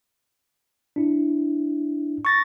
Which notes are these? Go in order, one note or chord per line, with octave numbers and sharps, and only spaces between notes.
D4 E4
C#6 A6 A#6